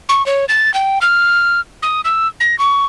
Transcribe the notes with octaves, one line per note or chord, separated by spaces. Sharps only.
C#6
C#5
A6
G5
F6
D#6
E6
A#6
C#6